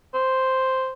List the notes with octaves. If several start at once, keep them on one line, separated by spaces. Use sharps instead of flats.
C5